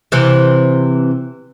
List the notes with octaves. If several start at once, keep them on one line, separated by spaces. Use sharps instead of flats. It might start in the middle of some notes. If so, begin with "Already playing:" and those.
C3 E3